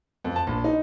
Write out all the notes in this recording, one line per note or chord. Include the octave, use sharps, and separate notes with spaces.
F2
A5
A#1
D#4